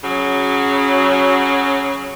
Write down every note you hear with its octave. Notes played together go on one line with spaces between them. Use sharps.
C#3 F#3